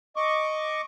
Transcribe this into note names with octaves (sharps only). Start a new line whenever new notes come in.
D#5 C#6 D6